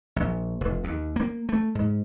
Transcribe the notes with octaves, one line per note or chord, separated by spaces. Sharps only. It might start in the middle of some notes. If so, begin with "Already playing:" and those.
A#1
F1
D#2
A#3
A3
G#2